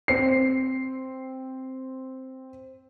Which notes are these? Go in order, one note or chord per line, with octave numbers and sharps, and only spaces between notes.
C4 C7